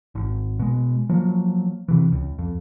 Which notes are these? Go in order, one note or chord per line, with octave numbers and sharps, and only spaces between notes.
G#1
B2 G#3
F3 F#3 A#3
C3 E3
C#2
F2